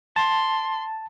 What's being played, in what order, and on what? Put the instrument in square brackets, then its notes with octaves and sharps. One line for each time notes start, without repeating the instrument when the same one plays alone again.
[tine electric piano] A5 [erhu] C6